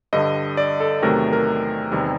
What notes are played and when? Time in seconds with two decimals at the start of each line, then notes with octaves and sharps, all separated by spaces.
0.13 G2 D3 G3 D#5
0.57 D5
0.80 A4
1.02 E2 C3 D#3 F#3 A3 A#4
1.33 A#4
1.92 E2 C3 D#3 G3